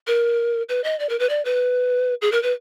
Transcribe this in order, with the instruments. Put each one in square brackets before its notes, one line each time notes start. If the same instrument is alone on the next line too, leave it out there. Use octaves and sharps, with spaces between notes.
[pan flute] A#4
B4
D#5
D5
A#4
B4
D5
B4
G#4
A#4
B4